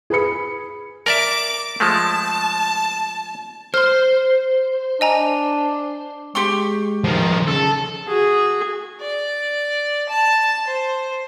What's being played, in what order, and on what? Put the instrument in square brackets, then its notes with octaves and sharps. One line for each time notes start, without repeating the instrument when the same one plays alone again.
[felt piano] G#4 B4 B5 C#7
[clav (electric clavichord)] A#4 D5 E5 [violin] D6
[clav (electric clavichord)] F3 G#3 A3 [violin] A5
[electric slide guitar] C5 [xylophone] C6 F6
[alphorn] D4 [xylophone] D#5 G#5 A#5
[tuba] G#3 [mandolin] G4 C6 C#6
[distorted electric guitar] D#3 F3
[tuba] C#3 [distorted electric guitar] A4
[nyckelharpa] F#4 G#4
[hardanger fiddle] D5
A5
C5